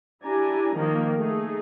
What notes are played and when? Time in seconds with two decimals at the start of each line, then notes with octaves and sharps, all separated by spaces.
0.24 D4 E4 G4 G#5 A#5
0.75 D#3 F3 A#3 D#4
1.17 A3 D#4 G#4